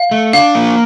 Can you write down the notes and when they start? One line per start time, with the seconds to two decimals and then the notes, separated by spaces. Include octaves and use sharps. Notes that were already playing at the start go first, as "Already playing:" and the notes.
Already playing: F5
0.11 A3
0.33 D4 F5
0.55 A#3